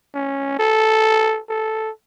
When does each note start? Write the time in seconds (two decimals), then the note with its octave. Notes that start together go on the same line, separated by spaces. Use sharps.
0.14 C#4
0.59 A4
1.50 A4